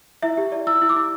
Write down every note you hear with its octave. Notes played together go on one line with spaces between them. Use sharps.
E4 E5
G4
D5
E4 E6
E4
D6
E4